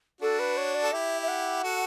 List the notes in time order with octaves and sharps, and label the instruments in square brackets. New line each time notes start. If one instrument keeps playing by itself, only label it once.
[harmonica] D4 F#4 [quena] A4
[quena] B4
C#5
D5
[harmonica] A4
[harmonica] E4 G4 [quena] E5
[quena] E5
F#5
[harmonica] F#4 A4